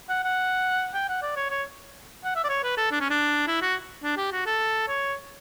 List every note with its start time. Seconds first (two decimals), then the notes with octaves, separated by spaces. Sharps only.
0.09 F#5
0.24 F#5
0.94 G5
1.09 F#5
1.22 D5
1.36 C#5
1.51 C#5
2.24 F#5
2.36 E5
2.44 D5
2.49 C#5
2.63 B4
2.77 A4
2.92 D4
3.01 C#4
3.10 D4
3.47 E4
3.62 F#4
4.04 D4
4.17 G4
4.33 F#4
4.46 A4
4.88 C#5